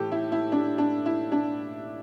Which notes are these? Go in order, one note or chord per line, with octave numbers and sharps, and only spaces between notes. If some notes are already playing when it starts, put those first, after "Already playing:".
Already playing: A2 E3 G4 A4
E4
E4
D4
D4
E4
D4